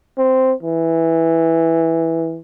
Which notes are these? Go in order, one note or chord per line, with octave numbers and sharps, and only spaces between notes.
C4
E3